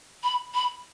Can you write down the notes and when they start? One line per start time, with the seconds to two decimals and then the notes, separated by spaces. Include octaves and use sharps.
0.24 B5
0.55 B5